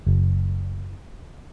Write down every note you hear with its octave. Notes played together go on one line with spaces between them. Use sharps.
F#1